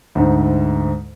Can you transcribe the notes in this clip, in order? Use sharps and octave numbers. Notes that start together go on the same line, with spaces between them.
D2 G#2